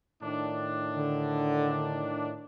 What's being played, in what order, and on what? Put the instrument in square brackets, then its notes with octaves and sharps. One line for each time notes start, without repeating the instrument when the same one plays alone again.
[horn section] A2 D#3 D4
[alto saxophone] D3